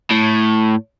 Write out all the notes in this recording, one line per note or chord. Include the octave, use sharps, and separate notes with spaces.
A2